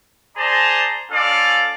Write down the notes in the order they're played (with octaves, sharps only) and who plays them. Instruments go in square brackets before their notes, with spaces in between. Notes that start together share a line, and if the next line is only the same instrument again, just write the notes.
[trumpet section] G#4 C5 D5 A5 A#5 C6
C#4 F4 A4 D5 F5